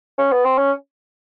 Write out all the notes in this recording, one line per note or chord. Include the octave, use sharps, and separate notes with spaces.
C#4
B3
C4
C#4